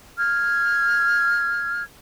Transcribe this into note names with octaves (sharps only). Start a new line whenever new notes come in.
F6 G#6